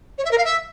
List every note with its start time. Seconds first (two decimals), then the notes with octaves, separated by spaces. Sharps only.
0.18 C#5
0.24 E5
0.31 A#4
0.37 F5
0.44 E5